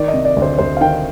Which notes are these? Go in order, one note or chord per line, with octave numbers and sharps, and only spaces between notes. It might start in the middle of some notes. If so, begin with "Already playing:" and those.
Already playing: D#3 D5
D#5
C3
D5
D2
C5
D2 C5
F5
D#3 G5